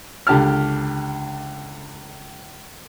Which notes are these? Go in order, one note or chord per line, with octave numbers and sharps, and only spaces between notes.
C#2 D3 G4 A5 F6